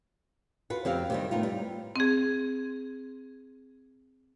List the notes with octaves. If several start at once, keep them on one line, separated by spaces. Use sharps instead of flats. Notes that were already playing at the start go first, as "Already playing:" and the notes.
F4 F#4 B4
F2 C4 G4 F5
C3 D#3 G3
A2 B3 D#4 F4
G3
C4 G#4